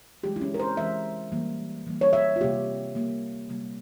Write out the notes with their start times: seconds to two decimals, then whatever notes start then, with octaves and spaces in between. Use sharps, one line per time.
0.23 E3 G#3 G4
0.36 E4
0.41 C#4
0.54 A#4
0.60 C5
0.77 E3 G#3 E5
1.32 E3 G3 A#3
1.86 E3 G3 A#3
2.01 C#5
2.13 E5
2.36 F4
2.41 C3 G3 A#3 G4
2.95 C3 G3 A#3
3.49 C3 G3 A#3